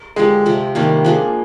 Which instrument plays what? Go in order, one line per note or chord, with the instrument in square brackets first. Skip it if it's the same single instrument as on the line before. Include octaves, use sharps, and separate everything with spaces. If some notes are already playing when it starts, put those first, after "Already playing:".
Already playing: [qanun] A#4
[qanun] D3 F3 C4 G4 [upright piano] G#3
[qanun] C3 F3 C4
[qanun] C3 D#3 G3 D4 [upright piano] A#3
[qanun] F3 A#3 D4 G#4